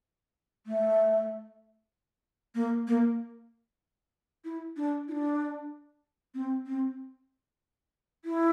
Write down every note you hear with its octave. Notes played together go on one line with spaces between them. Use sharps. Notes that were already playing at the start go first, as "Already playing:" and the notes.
A3
A#3
A#3
E4
D4
E4
D4
C4
C4
E4